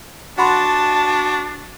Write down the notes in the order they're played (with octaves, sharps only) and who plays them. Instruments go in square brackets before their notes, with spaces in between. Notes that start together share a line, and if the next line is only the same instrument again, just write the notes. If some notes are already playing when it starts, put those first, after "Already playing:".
[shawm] D4 [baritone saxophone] F#4 [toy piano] F#5 B5 C6 [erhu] A5